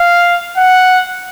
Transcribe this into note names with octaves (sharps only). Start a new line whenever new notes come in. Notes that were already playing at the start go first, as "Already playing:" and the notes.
Already playing: F5
F#5